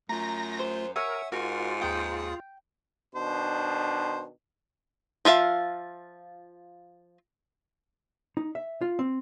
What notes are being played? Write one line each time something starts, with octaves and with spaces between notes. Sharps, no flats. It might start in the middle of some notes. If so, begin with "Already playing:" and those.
F#2 A3 F4 A#5 A#6
C5
A#4 C#5 E5 F#5 G#5
G#2 F4 F#4 A#4
D#2 G#4 G5 D#6
B2 D#3 D4 C5
F3 F4 E5 F5
D#4
E5
F4
C4